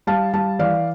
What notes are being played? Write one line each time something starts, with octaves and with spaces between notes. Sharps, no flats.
G3 F5 A5
G3 F5 A5
E3 D5 F5